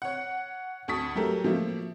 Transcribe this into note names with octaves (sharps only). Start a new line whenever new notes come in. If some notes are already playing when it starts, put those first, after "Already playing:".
C#5 F#5
D2 A5 C#6 D#6 B6
F#3 A3 G4 A4 A#4
F3 A3 A#3